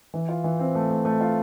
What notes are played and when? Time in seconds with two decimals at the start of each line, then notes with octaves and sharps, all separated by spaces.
0.14 E3
0.29 F4
0.44 E3
0.59 C4
0.75 A3
0.90 A3
1.05 A3
1.21 F4